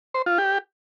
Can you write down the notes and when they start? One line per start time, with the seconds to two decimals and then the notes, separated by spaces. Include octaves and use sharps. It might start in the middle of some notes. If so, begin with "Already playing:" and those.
0.14 C5
0.26 F4
0.38 G4